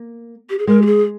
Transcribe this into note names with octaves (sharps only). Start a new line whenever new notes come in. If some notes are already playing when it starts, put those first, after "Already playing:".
Already playing: A#3
G4
G#4
G#3 A#4
G4
G#4